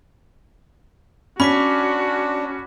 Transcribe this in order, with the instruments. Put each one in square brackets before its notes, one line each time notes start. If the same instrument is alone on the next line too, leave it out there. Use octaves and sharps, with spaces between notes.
[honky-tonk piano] C#4 [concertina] D4 [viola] F#4 [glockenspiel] B5 D6 B6